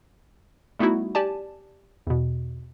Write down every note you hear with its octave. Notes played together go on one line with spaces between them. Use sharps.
G3 A3 B3 D#4 E4 F#4
G4 D5 G#5 A5
E2 B2